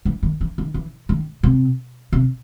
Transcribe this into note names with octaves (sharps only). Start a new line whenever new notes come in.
E3
D#3
E3
D#3
E3
D#3
C3
C3